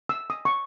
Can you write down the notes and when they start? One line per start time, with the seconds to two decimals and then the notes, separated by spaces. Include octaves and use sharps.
0.09 E6
0.30 D#6
0.45 C#6